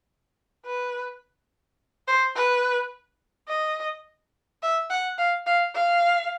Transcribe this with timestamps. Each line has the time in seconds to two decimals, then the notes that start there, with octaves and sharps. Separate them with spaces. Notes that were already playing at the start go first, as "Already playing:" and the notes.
0.66 B4
2.08 C5
2.36 B4
3.49 D#5
4.63 E5
4.90 F#5
5.18 F5
5.47 F5
5.75 F5